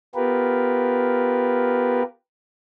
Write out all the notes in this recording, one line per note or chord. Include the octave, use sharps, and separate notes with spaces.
B3 F4 G4 A#4 B4